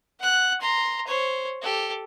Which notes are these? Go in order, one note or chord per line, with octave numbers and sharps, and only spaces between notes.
F#5 F#6
A#5 C6
C5 C#5
G4 A4